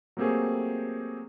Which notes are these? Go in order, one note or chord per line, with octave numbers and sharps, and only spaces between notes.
F#3 A3 A#3 C4 G4 G#4